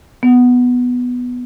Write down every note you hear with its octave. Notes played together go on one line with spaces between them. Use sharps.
B3